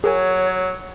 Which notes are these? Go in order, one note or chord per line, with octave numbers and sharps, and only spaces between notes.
F#3 G#4 A#4 C#5 G#5